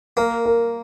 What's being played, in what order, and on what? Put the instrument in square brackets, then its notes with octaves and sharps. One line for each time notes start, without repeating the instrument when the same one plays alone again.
[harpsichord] A#3 [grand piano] A#4
[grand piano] A#4